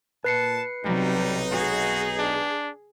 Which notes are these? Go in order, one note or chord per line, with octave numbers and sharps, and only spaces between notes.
A#2 B4 A5 C7 C#7
B1 C3 F#3 G3 D#4
F#4 G#4
D4